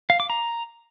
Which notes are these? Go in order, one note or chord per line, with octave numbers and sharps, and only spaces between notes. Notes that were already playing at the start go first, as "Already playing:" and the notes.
F5
D6
A#5